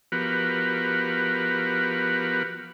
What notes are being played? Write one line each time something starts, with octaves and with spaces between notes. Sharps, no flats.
F3 B3 F#4 G4 A#4 B4